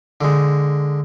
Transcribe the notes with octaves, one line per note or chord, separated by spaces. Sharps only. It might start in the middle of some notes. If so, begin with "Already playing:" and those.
D3 G#3